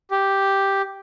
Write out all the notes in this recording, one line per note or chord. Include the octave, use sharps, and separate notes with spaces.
G4